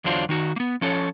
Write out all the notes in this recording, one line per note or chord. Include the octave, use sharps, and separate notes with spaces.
E2 D3 F#3 D4 F4 C5
D#3 D#4 F#4
A#3 B3
F3 C#4 A4 C#5